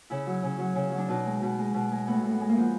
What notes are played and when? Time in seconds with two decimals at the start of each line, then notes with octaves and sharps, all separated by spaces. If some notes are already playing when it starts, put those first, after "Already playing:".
0.10 C#3 E4
0.26 F#3
0.44 C#3
0.59 F#3
0.75 C#3
0.92 F#3
0.98 D4
1.08 B2 D#4
1.25 G#3
1.42 B2
1.59 G#3
1.74 B2
1.91 G#3
2.07 A2 B3
2.23 A2
2.32 B3
2.40 G#3
2.49 A#3
2.57 F3 B3